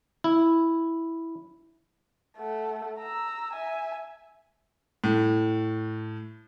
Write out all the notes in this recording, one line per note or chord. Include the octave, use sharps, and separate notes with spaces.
E4
A3 F#5
A#5 E6
E5 G#5
A2